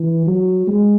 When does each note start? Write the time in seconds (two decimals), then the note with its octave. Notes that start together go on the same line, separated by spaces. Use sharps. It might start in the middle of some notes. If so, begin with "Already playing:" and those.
Already playing: E3
0.27 F#3
0.67 G#3